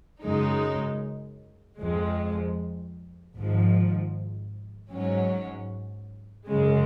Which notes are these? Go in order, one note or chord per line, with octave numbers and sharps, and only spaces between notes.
F#2 C#3 G#3 D#4
F2 F3 G#3
G#1 G#2 F3
G#2 F#3 C#4
F#2 C#3 G#3